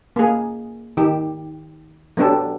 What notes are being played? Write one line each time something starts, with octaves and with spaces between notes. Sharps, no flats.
A#3 G#4
D#3 G4
F#3 B3 D4 G4 A4